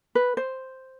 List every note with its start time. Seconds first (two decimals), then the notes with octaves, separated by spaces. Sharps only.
0.15 B4
0.37 C5